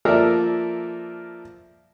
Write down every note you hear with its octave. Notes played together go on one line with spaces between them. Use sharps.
F3 A#3 A4 A#4 D5 E5